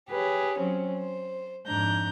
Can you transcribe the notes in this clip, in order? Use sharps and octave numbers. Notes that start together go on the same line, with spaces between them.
G4 G#4 B4 C#5
F#3 C4 C#4
C5
F2 G#2 D4 A#5 G6